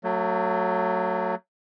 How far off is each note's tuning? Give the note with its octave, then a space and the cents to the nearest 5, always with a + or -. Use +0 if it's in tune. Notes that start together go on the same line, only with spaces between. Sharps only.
F#3 +0 A3 +35